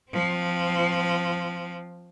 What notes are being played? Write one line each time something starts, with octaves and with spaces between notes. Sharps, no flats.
F3 C4